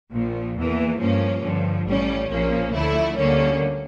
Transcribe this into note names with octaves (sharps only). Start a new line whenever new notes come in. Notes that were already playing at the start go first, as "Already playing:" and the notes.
A#1 A#2 F3
E2 E3 A#3
G2 F3 A#3 C#4
G2 D3 F3
A1 A2 G3 C#4
A#1 A#2 F3 A#3 C#4
D2 D3 F3 A3 E4
D2 D3 G3 A#3 C#4